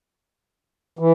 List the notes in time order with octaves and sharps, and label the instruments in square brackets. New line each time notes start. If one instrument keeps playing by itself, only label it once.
[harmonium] E3